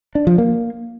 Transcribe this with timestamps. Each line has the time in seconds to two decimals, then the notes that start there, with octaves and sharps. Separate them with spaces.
0.15 D4
0.27 F3
0.38 A#3